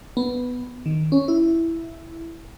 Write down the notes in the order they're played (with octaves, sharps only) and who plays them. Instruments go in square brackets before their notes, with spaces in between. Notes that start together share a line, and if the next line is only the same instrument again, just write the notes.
[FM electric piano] B3
D#3
C#4
E4